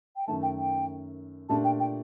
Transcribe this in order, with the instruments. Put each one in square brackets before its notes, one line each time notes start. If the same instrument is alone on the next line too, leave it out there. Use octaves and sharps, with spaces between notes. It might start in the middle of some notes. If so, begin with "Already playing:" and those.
[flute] G5
[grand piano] F#2 D#3 A3 [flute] A5
[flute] G5
G5
[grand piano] A#2 A3 D4 G4 [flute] A5
[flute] G5
G5